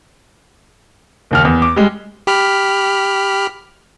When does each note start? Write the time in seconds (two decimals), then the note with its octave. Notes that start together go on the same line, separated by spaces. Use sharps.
1.31 F#1 D#2 F6
1.45 E2
1.62 D6
1.76 G3 G#3
2.27 G4 B5 F6